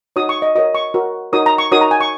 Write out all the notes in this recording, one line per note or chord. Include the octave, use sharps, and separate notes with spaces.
D#4 F#4 C#5 D#6
C#6
D#5
F#4 A#4 C#5 D#5
C#6
F#4 A#4 C#5
D#4 F#4 A#4 C#5 D#6
A#5
C#6
D#4 F#4 A#4 C#5 D#6
A#5
G#5
C#6